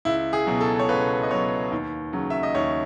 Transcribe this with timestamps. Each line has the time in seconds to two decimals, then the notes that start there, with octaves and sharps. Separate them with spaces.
0.05 C#2 E4
0.33 G#4
0.47 B2 F#3
0.60 A4
0.79 C#5
0.89 C#2 B4
1.23 D#5
1.31 B2 F#3 C#5
1.71 D#2
2.13 C#3 F#3
2.30 E5
2.43 D#5
2.55 D#2 C#5